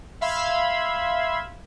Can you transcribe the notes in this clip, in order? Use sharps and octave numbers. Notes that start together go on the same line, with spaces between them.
E5 F5 B5 C6 E6 G#6